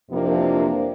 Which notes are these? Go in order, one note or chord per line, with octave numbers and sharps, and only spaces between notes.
F2 C3 E3 F3 A#3 D4